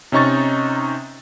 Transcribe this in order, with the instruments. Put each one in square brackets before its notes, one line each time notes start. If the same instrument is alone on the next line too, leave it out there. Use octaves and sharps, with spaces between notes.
[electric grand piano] C3 C#4 D#4 C#6 A6